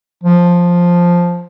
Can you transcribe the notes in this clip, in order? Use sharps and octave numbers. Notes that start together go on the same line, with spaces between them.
F3